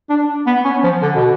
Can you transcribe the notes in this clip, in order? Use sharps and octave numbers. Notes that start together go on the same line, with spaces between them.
D4
B3
C#4
F3
D3
B2